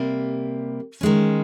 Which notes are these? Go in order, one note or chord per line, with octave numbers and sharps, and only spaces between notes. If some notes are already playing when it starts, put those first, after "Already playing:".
Already playing: C3 G3 A#3
D#3 G#3 C#4